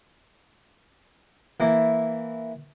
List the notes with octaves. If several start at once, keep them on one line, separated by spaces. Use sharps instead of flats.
E3 A#3 E4